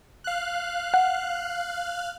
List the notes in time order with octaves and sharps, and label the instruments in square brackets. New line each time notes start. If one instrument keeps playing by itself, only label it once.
[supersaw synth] F5 F#6
[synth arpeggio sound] F#5